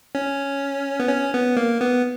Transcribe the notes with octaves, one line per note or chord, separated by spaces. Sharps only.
C#4
B3
C#4
B3
A#3
B3